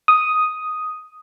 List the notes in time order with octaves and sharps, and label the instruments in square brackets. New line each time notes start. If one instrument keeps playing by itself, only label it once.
[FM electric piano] D#6